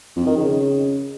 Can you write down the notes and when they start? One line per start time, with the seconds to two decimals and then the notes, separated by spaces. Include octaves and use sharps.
0.16 F2
0.26 D#3
0.37 C#3